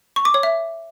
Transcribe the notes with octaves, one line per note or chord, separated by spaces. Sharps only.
C#6
D6
C#5
E5